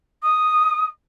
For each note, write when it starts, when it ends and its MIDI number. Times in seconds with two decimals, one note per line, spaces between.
0.23 0.84 87